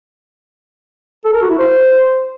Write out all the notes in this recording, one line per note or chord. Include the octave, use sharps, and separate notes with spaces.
A4
A#4
F#4
E4
C5